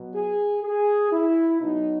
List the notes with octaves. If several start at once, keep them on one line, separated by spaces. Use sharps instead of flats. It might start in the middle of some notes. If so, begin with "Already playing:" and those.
Already playing: B2 F#3
G#4
G#4
E4
B2 F#3 D#4